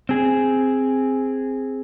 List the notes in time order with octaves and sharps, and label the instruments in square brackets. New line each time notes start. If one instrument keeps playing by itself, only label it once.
[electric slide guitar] C4 G#4